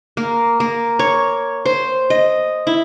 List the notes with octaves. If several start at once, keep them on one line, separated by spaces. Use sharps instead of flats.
A#3
A#3
C#5
C5
D#5
E4